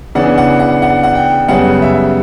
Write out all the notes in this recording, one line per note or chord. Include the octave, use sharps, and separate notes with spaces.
C#3 E3 B3 D4 F#5
F#5
F#5
F#5
F#5
G5
F#2 C#3 G3 B3 F#5
E5